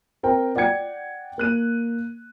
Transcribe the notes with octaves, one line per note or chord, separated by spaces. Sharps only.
C4 A#4 G5
D5 F#5 G5 G#6 C#7
A#3 F#6 D#7